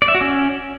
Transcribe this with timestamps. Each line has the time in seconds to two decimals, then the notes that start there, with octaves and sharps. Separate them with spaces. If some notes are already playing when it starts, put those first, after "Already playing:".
0.02 D5
0.08 E5
0.15 F#4
0.21 C#4